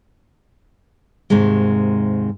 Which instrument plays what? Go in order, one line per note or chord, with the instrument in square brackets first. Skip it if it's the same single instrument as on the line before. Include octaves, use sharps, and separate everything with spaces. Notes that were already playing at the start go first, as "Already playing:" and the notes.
[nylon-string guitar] D#2 G#2 C3 D#3 G#3